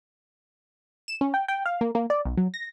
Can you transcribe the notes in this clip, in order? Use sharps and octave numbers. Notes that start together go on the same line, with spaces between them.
E7
C#4
G5
G5
F5
A#3
A#3
D5
B1
F#3
A#6